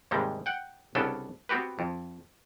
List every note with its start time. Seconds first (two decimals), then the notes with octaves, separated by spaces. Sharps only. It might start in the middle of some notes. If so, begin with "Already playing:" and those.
0.11 D#2 G#2 C3 G3 G#3
0.46 F#5 G5
0.95 C2 C#3 B3 C#4 D4 A4
1.49 B3 C4 F#4 G4 B4
1.79 F2